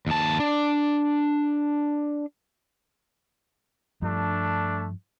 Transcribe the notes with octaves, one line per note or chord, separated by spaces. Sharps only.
D#2 A5
D4
G2 F3 G3 A3 D4